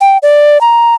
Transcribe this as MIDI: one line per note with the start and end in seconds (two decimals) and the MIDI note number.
0.01 0.18 79
0.23 0.60 74
0.61 0.95 82